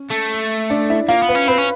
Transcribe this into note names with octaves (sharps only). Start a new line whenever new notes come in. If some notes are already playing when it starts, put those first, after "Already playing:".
Already playing: C#4
A3
D4 D5
E4 E5
A#3 F4 F5
B3
B4 B5
C#4
C4 B4 B5
C#4